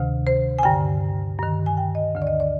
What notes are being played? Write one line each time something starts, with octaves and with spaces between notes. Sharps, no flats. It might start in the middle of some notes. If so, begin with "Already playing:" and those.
Already playing: D2 C3 D#3
C5
G#5
G2 D3 G5
G2 D#3
G#5
G5
D#5
D2 D3
D5
D#5
D5